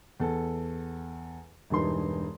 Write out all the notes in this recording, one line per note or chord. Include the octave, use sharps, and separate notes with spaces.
E2 A4
E1 G2 E3 D#4 C6